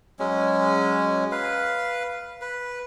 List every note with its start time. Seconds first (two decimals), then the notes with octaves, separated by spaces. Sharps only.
0.19 F#3 G#3 C#4
1.32 B4 F5
2.41 B4